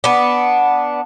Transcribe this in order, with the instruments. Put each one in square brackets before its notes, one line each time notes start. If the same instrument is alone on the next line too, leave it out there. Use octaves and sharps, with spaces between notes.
[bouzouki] B3 D4